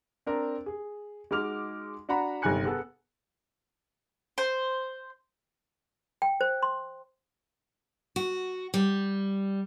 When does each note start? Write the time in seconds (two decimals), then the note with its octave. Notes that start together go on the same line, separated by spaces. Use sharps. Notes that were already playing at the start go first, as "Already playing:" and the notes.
0.26 C4 D4 A#4
0.66 G#4
1.31 G#3 D#4 F#4 D6 F6 F7
2.09 D4 F#4 F#5 A#5 B5
2.42 G1 C3 D#3 G#5 F#6 C#7
2.65 B3 G#4 A4
4.38 C5
6.22 G5
6.41 C5
6.62 C6
8.16 F#4
8.74 G3